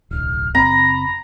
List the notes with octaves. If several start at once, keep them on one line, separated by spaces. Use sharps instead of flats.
D1 B1 F6
F#1 C4 A#5 B5